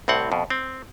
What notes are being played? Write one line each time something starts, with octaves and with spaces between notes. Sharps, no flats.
C2 A2 C4 F#5
F2 B2
C4